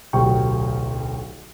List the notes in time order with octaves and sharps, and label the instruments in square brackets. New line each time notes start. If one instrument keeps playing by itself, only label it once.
[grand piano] D1 B1 F#3 G4 G5 C#6